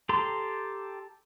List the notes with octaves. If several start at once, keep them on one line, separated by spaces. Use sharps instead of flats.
G4 A4 A#5 C6